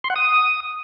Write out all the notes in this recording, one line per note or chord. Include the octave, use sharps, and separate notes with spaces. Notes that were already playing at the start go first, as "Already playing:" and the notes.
C6
F#5
D#6